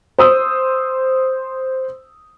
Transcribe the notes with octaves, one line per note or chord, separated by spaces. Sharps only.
C5 D#6 E6